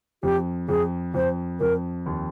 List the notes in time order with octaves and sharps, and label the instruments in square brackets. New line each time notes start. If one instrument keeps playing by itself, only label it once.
[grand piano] F2 [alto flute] G4
[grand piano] F2 [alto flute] G#4
[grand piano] F2 [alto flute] C5
[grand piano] F2 [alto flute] A#4
[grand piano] D#2